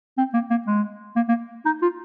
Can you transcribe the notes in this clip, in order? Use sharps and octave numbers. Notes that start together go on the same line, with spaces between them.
C4
A#3
A#3
G#3
A#3
A#3
D#4
F4